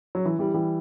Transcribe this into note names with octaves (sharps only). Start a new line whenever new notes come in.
F#3
E3
E3 G3
E3 G3